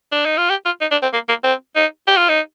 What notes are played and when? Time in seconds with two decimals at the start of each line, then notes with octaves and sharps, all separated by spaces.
0.12 D4
0.25 D#4
0.38 F4
0.50 G4
0.65 F4
0.81 D#4
0.91 D4
1.02 C4
1.13 A#3
1.28 A#3
1.44 C4
1.76 D#4
2.07 G4
2.17 F4
2.29 D#4